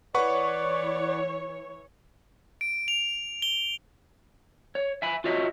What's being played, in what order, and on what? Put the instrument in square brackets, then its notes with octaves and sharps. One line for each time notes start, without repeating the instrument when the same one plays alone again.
[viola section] E3 C#5 [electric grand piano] B4 F#5 C#6 [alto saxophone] D5
[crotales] D7
F7
G7
[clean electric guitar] C#5
E5 G#5 B5
F4 F#4 C#5 D#5 E5